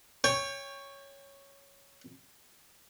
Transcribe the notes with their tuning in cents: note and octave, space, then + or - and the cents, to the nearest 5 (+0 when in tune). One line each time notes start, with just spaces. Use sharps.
C#5 +0 G5 +30